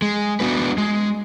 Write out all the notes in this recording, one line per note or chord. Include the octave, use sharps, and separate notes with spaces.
G#3
B3 D4 F#4 B4
G#3